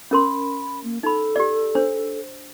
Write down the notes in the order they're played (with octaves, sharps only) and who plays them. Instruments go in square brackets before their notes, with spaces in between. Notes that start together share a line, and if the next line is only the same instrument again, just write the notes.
[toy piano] C#4 A#4 C6 [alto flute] B5
[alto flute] A#3
[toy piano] D#4 B5 [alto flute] A4
[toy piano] G4 D5
D4 C5